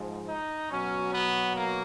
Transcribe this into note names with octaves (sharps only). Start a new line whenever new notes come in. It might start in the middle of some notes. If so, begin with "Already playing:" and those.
Already playing: G#2 F3
D#4
B2 F#3 C#4
B3
A#3